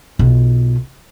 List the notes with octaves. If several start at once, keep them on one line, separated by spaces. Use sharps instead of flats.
B1 F4